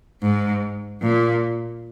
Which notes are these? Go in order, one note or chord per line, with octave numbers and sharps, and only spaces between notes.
G#2
A#2